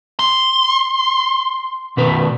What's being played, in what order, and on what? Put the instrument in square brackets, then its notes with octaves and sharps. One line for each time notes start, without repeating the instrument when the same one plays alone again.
[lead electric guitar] C6
[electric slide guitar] B2 D#3 B4